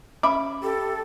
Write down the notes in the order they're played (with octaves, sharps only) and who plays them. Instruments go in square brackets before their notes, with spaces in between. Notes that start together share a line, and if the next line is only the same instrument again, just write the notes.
[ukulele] C#4 E5 B5 [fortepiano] D6
[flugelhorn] G4 [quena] A4